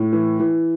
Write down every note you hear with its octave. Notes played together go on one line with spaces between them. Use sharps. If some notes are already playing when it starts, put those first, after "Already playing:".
Already playing: A2
E3
E3